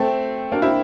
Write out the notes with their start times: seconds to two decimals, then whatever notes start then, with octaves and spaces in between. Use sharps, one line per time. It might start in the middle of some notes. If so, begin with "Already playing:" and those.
Already playing: A3 C4
0.52 A#3 D4
0.62 C4 E4